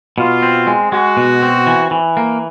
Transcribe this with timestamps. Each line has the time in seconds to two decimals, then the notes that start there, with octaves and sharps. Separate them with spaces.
0.17 B2 F4
0.42 C4
0.67 G#3
0.92 G#3 F#4
1.17 B2
1.42 C4
1.67 E3
1.91 E3
2.17 A#3